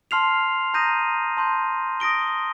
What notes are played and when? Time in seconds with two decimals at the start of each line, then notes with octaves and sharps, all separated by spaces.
0.11 A5 C6 F6 C7 F7
0.74 A#5 D#6 G6 A#6 D#7
1.37 A5 C6 G6
2.00 D#6 A#6 D7 G7